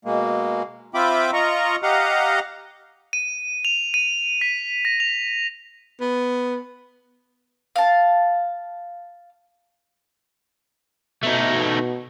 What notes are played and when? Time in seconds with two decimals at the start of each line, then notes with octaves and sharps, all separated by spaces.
0.05 B2 G#3 A#3
0.94 C4 F4 E5 G5 B5 D6
1.33 F4 D#5 A#5 C#6
1.83 G4 D#5 F5 F#5 A#5
3.13 D#7
3.65 F7
3.94 D#7
4.41 B6
4.85 A#6
5.00 F7
6.01 B3
7.76 F5 A5
11.23 B2 A3 D#4